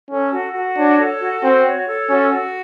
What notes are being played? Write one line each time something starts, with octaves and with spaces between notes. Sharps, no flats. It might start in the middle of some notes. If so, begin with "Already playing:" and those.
C#4 A4
F#4
F#4
D4 C#5
A4
F#4
C4 F#4
C#5
A4
C#4 F#4
F#4